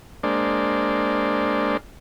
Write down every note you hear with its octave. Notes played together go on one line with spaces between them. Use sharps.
G#3 A#3 D4 C5 D5